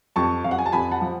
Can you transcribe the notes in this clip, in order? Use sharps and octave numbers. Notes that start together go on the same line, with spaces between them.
F2 A5 C#6
F2 F5
F#5
G#5
A5
F2 G#5 B5
F#5 A5
F3